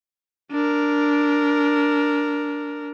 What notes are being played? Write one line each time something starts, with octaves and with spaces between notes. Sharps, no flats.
D4 A#4